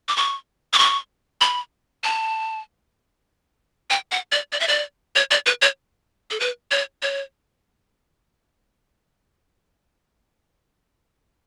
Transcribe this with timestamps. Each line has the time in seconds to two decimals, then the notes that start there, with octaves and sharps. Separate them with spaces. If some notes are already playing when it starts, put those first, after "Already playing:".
0.08 D6
0.17 C#6
0.73 D6
0.79 C#6
1.41 B5
2.04 A5
3.90 G5
4.12 F#5
4.32 D5
4.52 D5
4.60 E5
4.68 D5
5.16 C#5
5.31 D5
5.46 B4
5.62 C#5
6.31 A4
6.40 B4
6.71 C#5
7.02 C#5